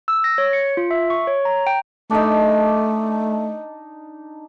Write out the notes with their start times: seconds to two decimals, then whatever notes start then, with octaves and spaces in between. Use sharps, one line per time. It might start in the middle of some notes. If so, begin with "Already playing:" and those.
0.08 E6
0.24 A#6
0.38 C#5
0.53 C#7
0.77 F4
0.91 E5
1.10 C#6
1.27 C#5
1.45 A#5
1.67 G5
2.11 A3 D4 D#4